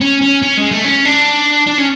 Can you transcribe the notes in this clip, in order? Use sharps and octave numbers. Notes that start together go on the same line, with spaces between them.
C#4
C#4
C#4
G#3
A3
C#4
D4
D4
C#4